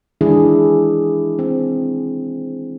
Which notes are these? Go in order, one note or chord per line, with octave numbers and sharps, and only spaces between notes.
D#3 E3 G#3 D4 E4 G#4
C4